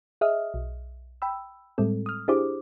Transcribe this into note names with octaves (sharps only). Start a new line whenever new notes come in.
G#4 D#5 E5 D#6 F6
B1
G5 B5 E6
A2 G3 G#3 C4 A4
D#6 F6
D4 E4 G4 G#4 C5 D6